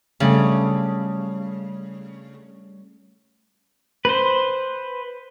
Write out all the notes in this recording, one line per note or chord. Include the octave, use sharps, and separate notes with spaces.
C#3 G3 A3 C#4
B4 C5